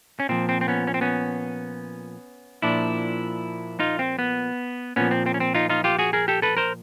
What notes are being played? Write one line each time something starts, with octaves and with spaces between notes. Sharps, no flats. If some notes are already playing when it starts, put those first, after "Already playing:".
C#4
A#2 F3 C4
C4
C4
B3 C#4
C#4
C4
B3 C#4
A#2 F3 D4 E4
D#4 F4
C4
B3
A#2 F3 B3 C#4
C4
C4
C#4
C4
D#4 F4
D#4 F4
F4 G4
F#4 G#4
G#4 A#4
G4 A4
A4 B4
A#4 C5